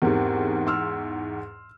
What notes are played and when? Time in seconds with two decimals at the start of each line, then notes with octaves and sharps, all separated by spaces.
0.02 E2 G#2 C4 G4 A#4
0.67 C6 E6 F6